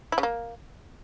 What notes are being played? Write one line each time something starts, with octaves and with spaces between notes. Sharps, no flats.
E4
C#3
A#3